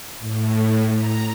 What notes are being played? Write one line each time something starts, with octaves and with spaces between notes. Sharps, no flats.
A2
A#5